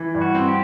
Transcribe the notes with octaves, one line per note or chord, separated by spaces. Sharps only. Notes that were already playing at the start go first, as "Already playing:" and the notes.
Already playing: E3
G2
F#4
C4
G4